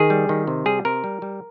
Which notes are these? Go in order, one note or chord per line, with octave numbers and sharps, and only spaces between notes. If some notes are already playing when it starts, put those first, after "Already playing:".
Already playing: D#3 G#4
G3
D#3
C3
G3 G#4
C3 A#4
G3
G3